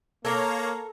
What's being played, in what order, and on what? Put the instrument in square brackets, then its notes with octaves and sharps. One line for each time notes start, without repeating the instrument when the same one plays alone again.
[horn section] A#3 [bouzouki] A4 A#4 [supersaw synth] C#5 F5 A#5